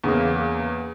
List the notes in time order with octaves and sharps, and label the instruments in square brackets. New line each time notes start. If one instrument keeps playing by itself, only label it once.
[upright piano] E2 C#3 A#3